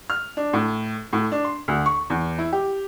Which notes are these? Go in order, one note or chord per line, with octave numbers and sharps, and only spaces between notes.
F6
D4
A2
A2
D4
C6
D2
C#6
E2
E4
G4